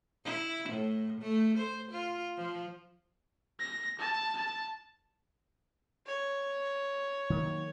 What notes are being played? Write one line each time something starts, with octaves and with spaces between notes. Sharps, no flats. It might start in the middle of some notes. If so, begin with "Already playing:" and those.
E4
A2
A3
C5
F4
F3
A#6
A5
A5
C#5
D#3 F#3 A#3